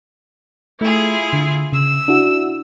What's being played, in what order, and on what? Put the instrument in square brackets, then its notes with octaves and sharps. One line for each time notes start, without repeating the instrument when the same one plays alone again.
[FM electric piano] A3 [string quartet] E4 F4 G#4
[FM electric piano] D3
[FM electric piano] C#3 [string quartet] E6
[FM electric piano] D4 E4 F#4